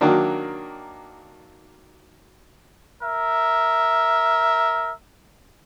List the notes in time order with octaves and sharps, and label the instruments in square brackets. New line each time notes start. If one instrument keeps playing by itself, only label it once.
[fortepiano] D#3 F#3 A#3 D4
[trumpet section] A#4 E5